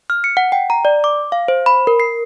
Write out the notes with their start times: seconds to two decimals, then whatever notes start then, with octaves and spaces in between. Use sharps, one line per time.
0.10 F6
0.24 C#7
0.37 F#5
0.52 G5
0.70 A#5
0.85 D5
1.04 D6
1.32 F5
1.48 C5
1.66 B5
1.87 A#4
2.00 C7